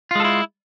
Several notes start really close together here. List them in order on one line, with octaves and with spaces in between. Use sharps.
F4 G#3 A4 E4